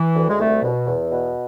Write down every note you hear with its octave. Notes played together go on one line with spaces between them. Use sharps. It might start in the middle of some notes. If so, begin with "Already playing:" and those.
Already playing: E3
D2
G#3
C2 A3
B2
E2
B2